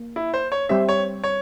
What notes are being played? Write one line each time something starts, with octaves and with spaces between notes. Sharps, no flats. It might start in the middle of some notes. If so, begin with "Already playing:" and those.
Already playing: A#3
E4
C5
C#5
G3 C4 G4 C5 E5
C#5
C#5